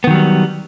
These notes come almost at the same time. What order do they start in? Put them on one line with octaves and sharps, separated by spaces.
B3 D#3 F#3 G3